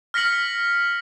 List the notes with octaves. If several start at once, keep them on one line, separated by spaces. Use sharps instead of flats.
F6 A#6 B6 C#7 F#7